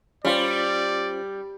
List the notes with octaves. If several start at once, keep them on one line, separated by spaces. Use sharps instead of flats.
G3 C#4 F4 C5 D5